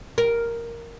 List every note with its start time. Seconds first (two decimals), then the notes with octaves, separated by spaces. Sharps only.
0.18 A#4